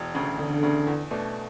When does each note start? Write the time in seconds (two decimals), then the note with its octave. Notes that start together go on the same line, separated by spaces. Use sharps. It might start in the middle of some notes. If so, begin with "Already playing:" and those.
Already playing: E1
0.15 D2 C#3
0.38 E1 D3
0.63 D2 C#3
0.87 E2
1.11 B2 A3 D4